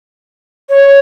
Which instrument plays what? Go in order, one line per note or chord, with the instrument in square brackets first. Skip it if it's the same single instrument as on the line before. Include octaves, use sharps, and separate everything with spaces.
[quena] C#5